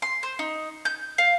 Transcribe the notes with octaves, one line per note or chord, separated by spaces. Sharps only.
C6
C5
D#4
G6
F5